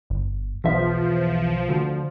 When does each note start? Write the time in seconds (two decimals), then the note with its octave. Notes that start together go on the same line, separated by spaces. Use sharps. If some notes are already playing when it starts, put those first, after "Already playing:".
0.10 G1
0.64 B1 E2 F3 E5
1.69 D2